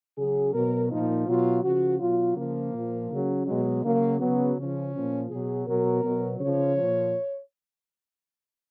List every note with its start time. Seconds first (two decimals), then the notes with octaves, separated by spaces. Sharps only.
0.17 C#3 F#3 G#4
0.53 B2 F#3 A#4
0.90 A#2 F3 D#4
1.26 B2 F#3 F4
1.63 C#3 F3 F#4
1.99 B2 F#3 F4
2.36 C#3 F3 A#3
2.73 A#2 F3
3.10 C#3 F#3
3.46 B2 F#3 G#3
3.83 C#3 F#3 A#3
4.20 C#3 F#3 B3
4.56 C#3 F3 C#4
4.94 A#2 F3
5.30 B2 F#3 G#4
5.67 B2 F#3 A#4
6.03 B2 F#3
6.40 C#3 F3 C#5
6.77 A#2 F3